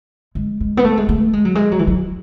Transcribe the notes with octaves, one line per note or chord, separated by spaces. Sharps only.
G#3
G#3
B3
A3
G#3
A3
G#3
F#3
G#3
F#3
E3
F#3